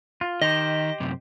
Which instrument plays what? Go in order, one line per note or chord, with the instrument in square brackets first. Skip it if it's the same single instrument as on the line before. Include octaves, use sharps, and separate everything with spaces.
[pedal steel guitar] F4
[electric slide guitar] D#3 [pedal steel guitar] G4 C5 [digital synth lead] D#5
[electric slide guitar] F#2 C3